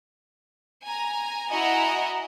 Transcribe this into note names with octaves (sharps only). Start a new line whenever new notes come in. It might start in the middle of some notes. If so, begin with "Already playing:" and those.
G#5 A#5
E4 F#4 D#5 F#5 G#5 A#5